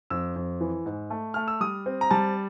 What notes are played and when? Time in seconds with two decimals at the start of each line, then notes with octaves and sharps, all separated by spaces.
0.10 F2 E6
0.36 F2
0.61 E3
0.86 G#2
1.10 A3
1.34 A3 F6
1.48 E6
1.61 G3 D#6
1.86 C4
2.01 A#5
2.11 G3 A5